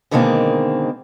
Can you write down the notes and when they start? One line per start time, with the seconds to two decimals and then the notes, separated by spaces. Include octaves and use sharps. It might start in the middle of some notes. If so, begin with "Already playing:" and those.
0.11 B2 D3 D#3 G#3 A#3 C4